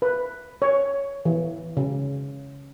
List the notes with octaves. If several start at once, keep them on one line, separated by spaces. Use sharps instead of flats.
B4
C#5
E3
C#3